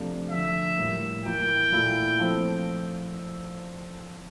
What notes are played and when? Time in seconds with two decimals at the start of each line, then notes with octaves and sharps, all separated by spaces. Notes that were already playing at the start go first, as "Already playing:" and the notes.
Already playing: C3 F3 A3 D4
0.29 D3 F3 A3 E5
0.78 A2 G3 A#3
1.24 E3 A#3 E4 G5
1.72 A#2 A3 E4
2.20 F3 A3 C4